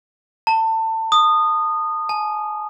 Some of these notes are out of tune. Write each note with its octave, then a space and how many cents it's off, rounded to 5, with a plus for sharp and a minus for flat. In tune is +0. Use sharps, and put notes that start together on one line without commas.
A5 +25
D#6 -15
G#5 +40